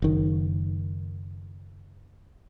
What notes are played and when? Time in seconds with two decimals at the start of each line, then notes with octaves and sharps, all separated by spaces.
0.02 F#1 D#3